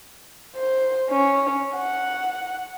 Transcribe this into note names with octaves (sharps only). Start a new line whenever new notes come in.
C5
C#4
F#5